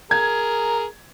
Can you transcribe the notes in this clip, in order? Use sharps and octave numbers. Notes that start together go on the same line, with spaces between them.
G#4 A#4 G#6